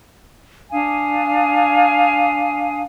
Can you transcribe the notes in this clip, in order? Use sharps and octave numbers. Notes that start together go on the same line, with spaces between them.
D4 F5 G#5 D#6